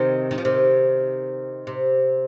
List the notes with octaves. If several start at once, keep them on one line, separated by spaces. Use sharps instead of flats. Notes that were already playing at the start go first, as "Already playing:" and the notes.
Already playing: C3 D#3
D#3
F3
C3 D#3
C3